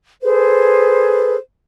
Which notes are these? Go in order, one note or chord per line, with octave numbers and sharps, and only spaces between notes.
G#4 A4 B4 C5